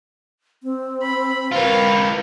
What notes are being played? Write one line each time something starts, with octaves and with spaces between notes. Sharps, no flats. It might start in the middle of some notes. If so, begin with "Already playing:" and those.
C4
B5
F4 A#4 B4 F5